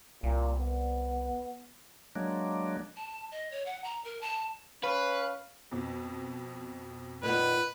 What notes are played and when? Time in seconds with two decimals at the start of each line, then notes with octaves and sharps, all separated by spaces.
0.23 C2 A#2
0.59 B3
2.16 F#3 G#3 A#3 D4
2.97 A5
3.32 D#5
3.51 C#5
3.66 F#5
3.84 A#5
4.05 A#4
4.21 A5
4.83 C#4 B4 F5
5.71 F2 B2
7.23 A#2 D#3 B3 B4